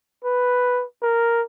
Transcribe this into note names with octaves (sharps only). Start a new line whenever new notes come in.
B4
A#4